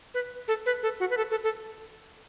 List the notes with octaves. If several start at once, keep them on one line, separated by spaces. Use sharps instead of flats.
B4
A4
B4
A4
F#4
B4
A4
A4
A4